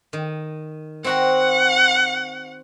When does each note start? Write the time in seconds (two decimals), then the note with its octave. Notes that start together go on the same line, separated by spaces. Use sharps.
0.13 D#3
1.04 C4 F#4 F#5 A#5